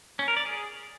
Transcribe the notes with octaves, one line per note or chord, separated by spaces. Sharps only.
C#4
A#4
D5
G#4